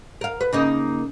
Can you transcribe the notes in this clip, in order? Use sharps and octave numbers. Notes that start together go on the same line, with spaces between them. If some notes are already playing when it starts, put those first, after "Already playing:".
A#4 F5
B4
C#3 A#3 D#4